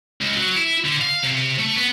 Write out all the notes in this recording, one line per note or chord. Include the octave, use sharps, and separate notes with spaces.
C#2
F#3
E4
D3
F5
C3
A3
B3